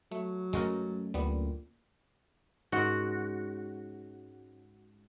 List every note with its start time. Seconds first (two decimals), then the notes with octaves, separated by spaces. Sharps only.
0.12 F#3 A3
0.53 F#2 G#3 A3 C#4 F#4 A#4
1.14 D2 A#2 G3 B3
2.72 G#2 C#4 F#4 A#4